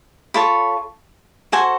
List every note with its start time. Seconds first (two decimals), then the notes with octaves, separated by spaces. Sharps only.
0.34 F4 A4 C#5 B5
1.52 F#4 A4 C5 G#5